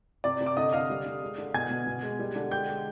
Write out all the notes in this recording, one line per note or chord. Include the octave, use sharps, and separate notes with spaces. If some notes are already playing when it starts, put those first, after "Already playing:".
C3 D5 D6
C3
D6
D3 D#5 D#6
D3 F5 F6
G3
D3
G#3
D3
B2 G#5 G#6
B2
B2
G#3
G3
D3
G#3 G5 G6
G#3